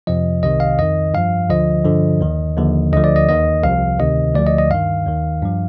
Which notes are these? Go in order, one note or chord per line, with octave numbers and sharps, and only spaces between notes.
F2 C3 F3 D#5
C2 C3 D#3 D#5
F5
F2 D#3 D#5
G2 F3 F5
D2 D3 F3 D#5
G2 D3 F3
D#2 D#3
D#2 D3 F3
D2 D3 F3 D#5
D5
D#5
D#2 D#3 D#5
C2 C3 F3 F5
D2 C3 D#3 D#5
D2 D3 F3 D5
D#5
D#5
G2 D#3 F5
D#2 D#3
G2 F3